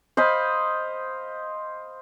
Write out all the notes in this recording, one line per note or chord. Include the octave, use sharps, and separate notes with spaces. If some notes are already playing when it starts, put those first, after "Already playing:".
C5 D#5 F5 B5